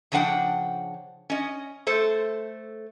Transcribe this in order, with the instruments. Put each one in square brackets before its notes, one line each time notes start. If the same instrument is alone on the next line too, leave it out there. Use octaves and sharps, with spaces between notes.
[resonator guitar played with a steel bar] C#3 F3 D4 F#5 G5
C#4 D#5
A3 A4 C5